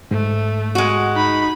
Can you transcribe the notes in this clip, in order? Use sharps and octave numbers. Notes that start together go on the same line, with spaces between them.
G#2 A3
G#3 F#4
D#4 B5